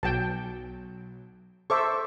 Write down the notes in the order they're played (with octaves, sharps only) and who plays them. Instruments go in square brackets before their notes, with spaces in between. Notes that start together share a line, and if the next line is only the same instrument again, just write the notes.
[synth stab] B1 F#3 [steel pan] G5 A5
[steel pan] A4 C5 E5 [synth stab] C#6 D6